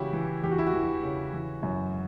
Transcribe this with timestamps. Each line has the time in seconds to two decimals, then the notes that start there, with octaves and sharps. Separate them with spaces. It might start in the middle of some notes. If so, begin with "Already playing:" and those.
Already playing: C#3 E3 E4 F#4 G4
0.13 E3
0.43 E2 G4
0.51 F#4
0.58 E4
0.67 F#4
0.73 E3
1.03 C#3
1.33 E3
1.63 F#2